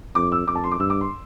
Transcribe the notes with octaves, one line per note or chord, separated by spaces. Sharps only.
F2 D6
E6
F2 D6
A5
C6
D6
G2 E6
D6
C6